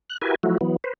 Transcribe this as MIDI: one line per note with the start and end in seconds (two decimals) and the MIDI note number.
0.10 0.18 90
0.22 0.35 64
0.22 0.35 66
0.22 0.35 67
0.22 0.35 70
0.22 0.35 71
0.22 0.35 80
0.43 0.58 53
0.43 0.58 54
0.43 0.58 57
0.43 0.58 64
0.43 0.58 66
0.61 0.76 52
0.61 0.76 54
0.61 0.76 59
0.84 0.93 71
0.84 0.93 72